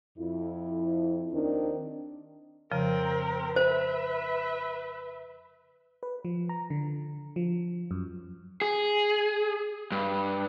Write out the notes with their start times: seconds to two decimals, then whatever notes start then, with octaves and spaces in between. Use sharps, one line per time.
0.18 F2 E4
1.32 D#2 D#3 C4 D4
2.71 F2 C#3 F3 C4 A#4
3.56 B4 C5 E5
6.03 B4
6.25 F3
6.49 A#5
6.70 D3
7.36 F3
7.91 F#2
8.62 G#4
9.92 G2